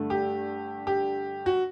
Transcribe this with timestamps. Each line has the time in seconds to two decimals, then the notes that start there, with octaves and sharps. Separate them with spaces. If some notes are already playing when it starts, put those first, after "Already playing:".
Already playing: G2 D3 A3
0.10 G4
0.87 G4
1.46 F#4